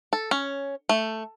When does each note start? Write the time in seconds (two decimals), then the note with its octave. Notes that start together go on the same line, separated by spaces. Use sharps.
0.13 A4
0.31 C#4
0.89 A3